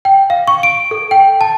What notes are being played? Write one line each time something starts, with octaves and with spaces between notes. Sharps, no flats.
G5
F5
C#6
D7
A4
G5
A5